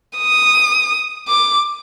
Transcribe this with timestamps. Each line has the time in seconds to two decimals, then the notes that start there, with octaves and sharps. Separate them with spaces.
0.18 D#6
1.28 D6